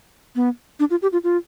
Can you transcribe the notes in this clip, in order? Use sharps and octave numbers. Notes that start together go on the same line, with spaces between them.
B3
D4
F4
G4
F4
F4